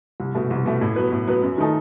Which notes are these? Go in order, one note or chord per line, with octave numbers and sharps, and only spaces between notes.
C2
B2 A3
C2
B2 A3
A2
F#3 B3 F#4 B4
A2
F#3 B3 F#4 B4
F#2
D#3 A3 D#4 A4